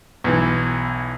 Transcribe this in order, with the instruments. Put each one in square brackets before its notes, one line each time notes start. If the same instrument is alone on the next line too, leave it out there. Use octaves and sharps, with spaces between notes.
[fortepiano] B1 E3